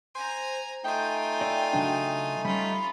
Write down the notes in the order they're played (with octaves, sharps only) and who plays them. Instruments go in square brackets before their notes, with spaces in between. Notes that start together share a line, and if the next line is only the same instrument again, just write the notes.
[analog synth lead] C5 [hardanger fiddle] G#5 A#5
[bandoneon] A3 D#4 [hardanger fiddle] F4 G#5 [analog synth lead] G5
[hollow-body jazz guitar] D5 E5
C#3 F#3 D4
[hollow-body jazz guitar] G3 [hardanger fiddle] C#4 F4 [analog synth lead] B5